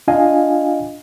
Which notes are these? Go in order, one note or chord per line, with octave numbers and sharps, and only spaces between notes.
D4 F4 D#5 F5 G#5